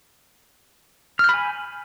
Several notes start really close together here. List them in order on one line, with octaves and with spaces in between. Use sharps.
F6 G6 B5 G#5